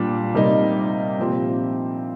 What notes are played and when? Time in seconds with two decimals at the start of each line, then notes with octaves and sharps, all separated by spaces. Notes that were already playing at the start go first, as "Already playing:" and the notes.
Already playing: A#2 G3 D4
0.34 C3 G3 A#3 D#4
1.19 A#2 F3 C4 G4